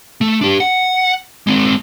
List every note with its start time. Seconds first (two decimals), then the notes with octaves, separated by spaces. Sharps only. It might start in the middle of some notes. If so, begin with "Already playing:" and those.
0.21 A3
0.41 D4 G4
0.60 F#5
1.47 G#3 C4